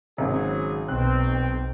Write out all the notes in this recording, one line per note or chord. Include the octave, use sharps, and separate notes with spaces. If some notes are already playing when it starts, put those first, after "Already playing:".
G#1 C#3 F#3 G#4
B1 C4 F#6